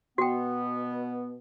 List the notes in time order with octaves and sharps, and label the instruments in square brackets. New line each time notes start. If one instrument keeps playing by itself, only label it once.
[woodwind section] B2 B3 [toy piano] F#4 G5